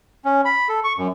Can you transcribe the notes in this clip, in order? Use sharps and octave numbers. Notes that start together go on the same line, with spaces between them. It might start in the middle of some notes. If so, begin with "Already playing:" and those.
C#4
B5
A4
C#6
F#2